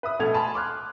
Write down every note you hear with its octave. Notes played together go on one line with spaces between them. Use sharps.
B4 E5 D#6
A#1 B2 A3 A4 G#6 F7
G#5 A5 B5 C6
C6 D6 F6 F#6